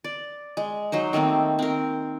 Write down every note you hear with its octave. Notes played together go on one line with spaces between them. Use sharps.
D5
G#3
F#3 D#4 C5
D#3 A3 A#3 C4
C4 A#4